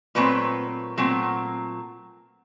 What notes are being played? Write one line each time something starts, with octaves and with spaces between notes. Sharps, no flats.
A#2 F#3 A3 C4 B4
A#2 F#3 A3 C4